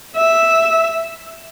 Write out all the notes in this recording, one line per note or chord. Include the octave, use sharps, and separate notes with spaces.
E5